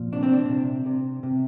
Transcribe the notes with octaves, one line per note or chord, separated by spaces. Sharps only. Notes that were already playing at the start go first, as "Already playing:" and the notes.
Already playing: A#2 F3
C3 D4
C4
D4
C3
C3
C3